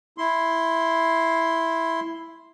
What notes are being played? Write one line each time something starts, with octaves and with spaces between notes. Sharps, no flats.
E4 C6